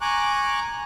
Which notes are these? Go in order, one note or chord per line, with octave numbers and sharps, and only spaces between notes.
G#5 A#5 C#6 D6 F#6